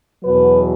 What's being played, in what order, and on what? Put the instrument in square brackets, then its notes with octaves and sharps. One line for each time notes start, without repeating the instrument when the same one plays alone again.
[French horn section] E2 B2 F#3 B4